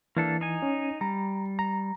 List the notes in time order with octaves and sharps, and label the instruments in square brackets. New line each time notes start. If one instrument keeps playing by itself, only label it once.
[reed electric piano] E3 [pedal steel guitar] A#3 D4 A4
[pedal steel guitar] D#4 G#5
[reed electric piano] C#4
[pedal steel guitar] G3 [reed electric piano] A#5
[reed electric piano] A#5